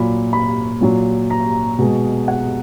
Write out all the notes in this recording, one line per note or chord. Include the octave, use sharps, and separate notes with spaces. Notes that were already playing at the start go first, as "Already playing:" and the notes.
Already playing: A#2 F#3 B5
B5
A#2 F#3
A#5
B2 G#3
F#5